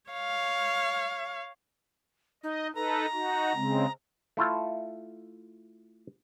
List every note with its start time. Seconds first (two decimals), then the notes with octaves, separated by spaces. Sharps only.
0.11 C#5 F5
2.43 D#4 D#5
2.75 D#4 A4 B4 A#5
3.13 D#4 F#4
3.55 C#3 G#3 C4
4.37 A3 E4 F4 A4